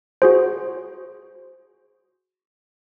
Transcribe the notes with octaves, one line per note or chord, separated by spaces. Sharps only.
F#4 G#4 C5